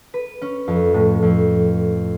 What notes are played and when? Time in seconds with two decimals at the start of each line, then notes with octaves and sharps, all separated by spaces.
0.14 B4
0.41 C#4
0.68 F2
0.94 A2
1.22 F2